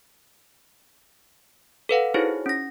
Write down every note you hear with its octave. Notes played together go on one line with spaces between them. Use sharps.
A4 B4 F5 F#5
D#4 E4 F#4 G#4 C5 C#5
C#4 A#6